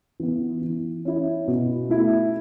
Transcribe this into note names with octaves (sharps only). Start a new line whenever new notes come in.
E3 B3
E3
C#4 E4
B2
A3 E4